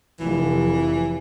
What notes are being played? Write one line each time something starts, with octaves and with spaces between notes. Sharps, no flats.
F1 E3